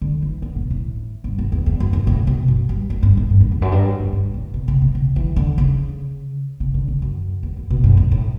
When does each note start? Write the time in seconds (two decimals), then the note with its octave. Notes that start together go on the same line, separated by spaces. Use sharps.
0.01 D3
0.22 E3
0.42 D3
0.56 B2
0.70 A2
1.24 G2
1.38 F#2
1.52 E2
1.66 E2
1.80 F#2
1.93 F#2
2.07 A2
2.27 B2
2.48 F#2
2.69 G2
2.90 F#2
3.03 G2
3.17 A2
3.30 G2
3.41 F#2
3.52 E2
3.62 F#2
3.72 G2
3.99 G2
4.12 G2
4.34 A2
4.54 B2
4.68 C#3
4.82 B2
4.95 C#3
5.16 E3
5.36 D3
5.58 C#3
6.60 C#3
6.74 D3
6.88 C#3
7.02 F#2
7.43 E2
7.57 F#2
7.70 B2
7.84 F#2
7.97 B2
8.12 A2